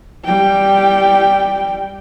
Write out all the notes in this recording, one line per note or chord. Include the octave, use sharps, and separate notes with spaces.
G3 G5